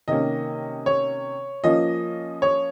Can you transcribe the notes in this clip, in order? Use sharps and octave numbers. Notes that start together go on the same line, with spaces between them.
C3 D#3 A#3 C#4 D#5
C#5
F3 A#3 C#4 D#5
C#5